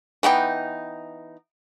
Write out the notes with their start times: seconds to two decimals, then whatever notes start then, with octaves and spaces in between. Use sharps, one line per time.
0.23 E3 B3 D#4 G5